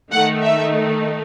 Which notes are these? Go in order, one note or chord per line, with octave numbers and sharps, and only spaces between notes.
D#3 A3 D#4 F#5
E5